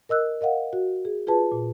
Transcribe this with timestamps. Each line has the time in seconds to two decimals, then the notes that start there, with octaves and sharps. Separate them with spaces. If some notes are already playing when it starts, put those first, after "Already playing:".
0.09 A#4 D#5 E6 F#6
0.41 A#4 D#5 F5 F#5
0.73 F#4
1.05 G#4
1.27 F4 G#4 B4 A5
1.52 A#2